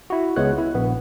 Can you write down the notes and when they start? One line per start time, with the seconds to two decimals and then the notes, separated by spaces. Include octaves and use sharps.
0.10 E4 F#4
0.36 C#2 G#3 B3 C#5 F#6
0.58 E4
0.74 A#1 B3